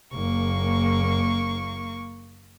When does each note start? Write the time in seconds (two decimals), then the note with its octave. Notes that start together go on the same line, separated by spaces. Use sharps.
0.14 F#1 A#3 C#6